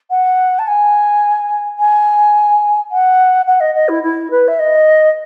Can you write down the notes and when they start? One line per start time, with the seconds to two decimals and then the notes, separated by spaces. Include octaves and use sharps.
0.11 F#5
0.59 A5
0.67 G#5
1.79 G#5
2.91 F#5
3.47 F#5
3.60 D#5
3.75 D#5
3.89 E4
4.03 E4
4.31 B4
4.48 E5
4.59 D#5